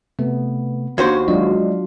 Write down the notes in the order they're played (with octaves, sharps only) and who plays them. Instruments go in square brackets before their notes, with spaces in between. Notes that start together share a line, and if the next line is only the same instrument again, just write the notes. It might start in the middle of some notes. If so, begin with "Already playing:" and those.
[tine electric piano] C3 A3 [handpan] B3
[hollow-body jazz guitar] D#2 F#4 C5 [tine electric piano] D4 G#6
[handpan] F#3 D4 F4 [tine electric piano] G#3 D#5